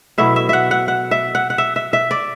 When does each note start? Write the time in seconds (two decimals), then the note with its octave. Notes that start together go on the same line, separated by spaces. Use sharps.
0.18 B2 F#3 A3 E4 E5
0.36 E5
0.49 E5 F#5
0.71 F#5
0.88 F#5
1.11 E5
1.35 F#5
1.50 F#5
1.58 E5
1.76 E5
1.93 E5
2.11 D5